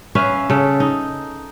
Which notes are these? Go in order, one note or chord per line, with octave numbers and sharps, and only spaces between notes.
C#4 B4 E5 F5
C#3 A4
D#4